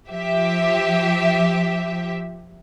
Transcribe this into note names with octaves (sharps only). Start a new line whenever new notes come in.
F3 G4 E5